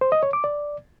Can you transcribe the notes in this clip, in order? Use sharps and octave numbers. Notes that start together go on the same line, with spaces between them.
C5
D#5
C#5
D6
D5